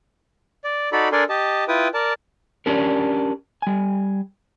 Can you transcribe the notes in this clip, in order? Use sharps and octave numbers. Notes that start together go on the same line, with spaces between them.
D5
D#4 F#4 A4 D5 B5
D4 A4 A#4 D5 G#5 C6
G4 D#5 A5
E4 F4 B4 G5 D#6
A#4 D5 A5
C#4 D4 G4 A#4
G3 G#5